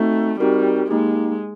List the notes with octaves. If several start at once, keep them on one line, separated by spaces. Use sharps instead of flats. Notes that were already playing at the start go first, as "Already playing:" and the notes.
Already playing: A3 C4 D#4 F#4
G3 C4 D#4 F#4 A#4
G#3 A#3 D#4 G4